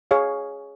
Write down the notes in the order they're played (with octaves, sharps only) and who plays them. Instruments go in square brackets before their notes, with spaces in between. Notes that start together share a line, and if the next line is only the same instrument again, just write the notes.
[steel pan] G#4 C#5 F5